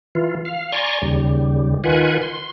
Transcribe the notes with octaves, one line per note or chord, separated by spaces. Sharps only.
E3 F4
F5
D5 G#5 A#5 C6 C#6
D#2 C#3 G3
D#3 F4 B4 F#5 G#5
C6